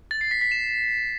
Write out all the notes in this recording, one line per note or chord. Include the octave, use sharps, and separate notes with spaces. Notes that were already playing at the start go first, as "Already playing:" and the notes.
A6
C7
B6
B6
E7